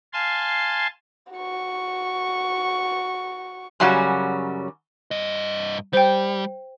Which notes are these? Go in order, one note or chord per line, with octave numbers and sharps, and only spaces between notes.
F5 G#5 A5 C6
F#4 C#6
F#2 C#3 F#3 G3 C#4 F#4
G2 D#5
G3 C5 G5